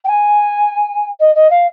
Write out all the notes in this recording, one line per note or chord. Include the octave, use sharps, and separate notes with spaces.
G5
G#5
D#5
D#5
F5